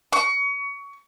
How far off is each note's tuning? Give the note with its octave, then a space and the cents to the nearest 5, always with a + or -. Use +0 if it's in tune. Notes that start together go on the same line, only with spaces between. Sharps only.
C#6 +25